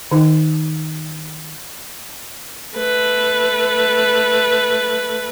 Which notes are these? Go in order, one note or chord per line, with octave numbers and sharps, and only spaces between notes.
D#3 D#4
A3 B4